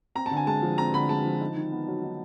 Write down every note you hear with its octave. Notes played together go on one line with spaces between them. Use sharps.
C4 A#5
A5
D3
G#5
G#3 A5
F3
C4 A#5
D3 B5
G#3 A5
F3
D#4
D#3
B3
F#3
D#4